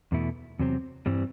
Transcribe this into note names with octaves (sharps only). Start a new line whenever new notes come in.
E2 B2 A3 E4
E2 C3 F#3 C4
G2 E3 G3 C4